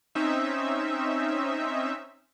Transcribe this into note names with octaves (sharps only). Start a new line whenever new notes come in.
C4 C#4 D#4 E5